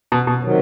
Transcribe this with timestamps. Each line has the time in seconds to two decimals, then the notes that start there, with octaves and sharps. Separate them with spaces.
0.12 B2
0.27 B2
0.42 C3 D#3 F#3